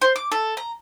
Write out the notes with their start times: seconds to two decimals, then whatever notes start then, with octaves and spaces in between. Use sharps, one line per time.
0.02 C5
0.16 D6
0.32 A4
0.57 A#5